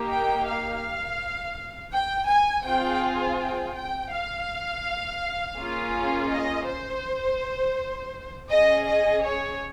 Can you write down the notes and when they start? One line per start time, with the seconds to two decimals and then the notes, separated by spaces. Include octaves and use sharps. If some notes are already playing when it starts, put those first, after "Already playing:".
Already playing: A#3 D#4 G4
0.10 G5
0.46 F5
1.92 G5
2.28 G#5
2.65 C4 F4 G#4 G5
3.39 G5
3.75 G5
4.12 F5
5.58 A#3 C#4 F4 G#4
6.31 D#5
6.68 C5
8.51 C#4 G#4 D#5
8.87 D#5
9.24 C#5